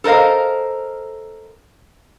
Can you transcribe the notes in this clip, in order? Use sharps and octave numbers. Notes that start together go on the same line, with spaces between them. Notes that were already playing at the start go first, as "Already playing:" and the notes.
A4 A#4 C5 D#5 F5